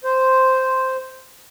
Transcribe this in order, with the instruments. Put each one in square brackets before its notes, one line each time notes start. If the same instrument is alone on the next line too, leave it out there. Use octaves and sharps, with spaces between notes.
[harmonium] C5